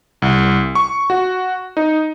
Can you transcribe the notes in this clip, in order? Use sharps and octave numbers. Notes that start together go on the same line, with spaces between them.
C2
C#6
F#4
D#4